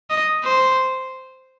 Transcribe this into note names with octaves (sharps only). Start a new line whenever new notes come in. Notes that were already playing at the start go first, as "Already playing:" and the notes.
D#5
C5